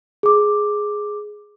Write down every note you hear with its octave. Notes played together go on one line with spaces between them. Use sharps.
G#4 D6